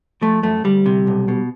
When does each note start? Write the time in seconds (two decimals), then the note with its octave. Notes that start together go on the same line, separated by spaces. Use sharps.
0.22 F3 A3
0.43 F#2 A3
0.64 D2 G3
0.86 C3
1.07 B1
1.28 B2